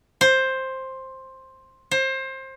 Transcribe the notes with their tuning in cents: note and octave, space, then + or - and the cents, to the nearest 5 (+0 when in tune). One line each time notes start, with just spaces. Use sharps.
C5 +10
C5 +25